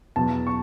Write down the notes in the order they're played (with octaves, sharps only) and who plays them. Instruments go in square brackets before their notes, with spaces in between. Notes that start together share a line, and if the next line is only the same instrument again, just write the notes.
[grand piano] E2 B2 F#3 A5
C#6